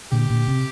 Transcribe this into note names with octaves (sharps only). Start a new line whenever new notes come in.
A#2 D3 G4
A#2 D3
C3